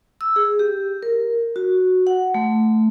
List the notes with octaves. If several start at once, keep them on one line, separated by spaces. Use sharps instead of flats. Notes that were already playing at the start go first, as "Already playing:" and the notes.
E6
G#4
G4
A#4
F#4
F#5
A3